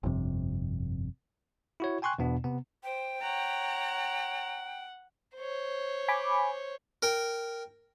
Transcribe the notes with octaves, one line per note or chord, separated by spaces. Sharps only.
G1 F2 C3
E4 F#4 C#5
G5 G#5 C6 C#6 F#6
E2 B2 B3 D4
C3 B3
C5 G5
C#5 F#5 A#5
C5 C#5
G#5 B5 D6
A#4 G5